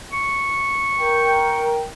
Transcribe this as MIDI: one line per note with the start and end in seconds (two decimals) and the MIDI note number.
0.13 1.72 85
1.00 1.86 70
1.00 1.86 79